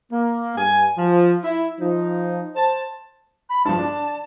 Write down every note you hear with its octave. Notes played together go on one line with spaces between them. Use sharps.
A#3
G2 G#5
F3
E4
F3 D#4
C5 A5
B5
G2 F3 A5
D4